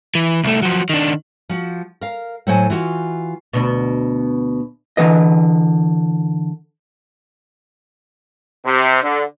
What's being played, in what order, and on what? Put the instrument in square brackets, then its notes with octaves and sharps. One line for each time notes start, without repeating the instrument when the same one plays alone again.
[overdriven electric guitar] E3
C2 A3
F3 F#3
D#3 D4
[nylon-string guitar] F3 F#4
A#4 F5
A2 F#3 C5 G5 G#5
E3 F4 F#4
[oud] D2 B2
[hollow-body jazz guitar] D3 E3 B4 D#5
[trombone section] C3
D3